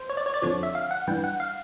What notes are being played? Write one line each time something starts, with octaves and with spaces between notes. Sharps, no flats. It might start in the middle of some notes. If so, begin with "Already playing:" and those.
Already playing: C5
C#5
D5
C#5
D5
F2 D3 F3 C#5
E5
F5
F#5
G2 E3 G5
F#5
F5